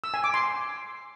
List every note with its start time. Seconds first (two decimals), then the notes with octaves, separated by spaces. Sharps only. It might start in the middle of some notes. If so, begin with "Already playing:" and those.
0.04 E6
0.14 G#5
0.24 D6
0.34 C6